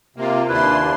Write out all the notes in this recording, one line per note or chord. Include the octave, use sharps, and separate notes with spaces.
C3 A#3 F4
D#2 D4 E4 B4 C6